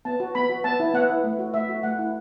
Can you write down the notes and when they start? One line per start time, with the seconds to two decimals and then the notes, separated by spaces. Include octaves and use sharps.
0.05 B3 A5
0.20 F#4
0.35 B3 B5
0.49 F#4
0.64 B3 A5
0.80 E4
0.94 B3 F#5
1.09 E4
1.24 A3
1.39 F#4
1.54 A3 E5
1.69 F#4
1.83 A3 F#5
1.99 E4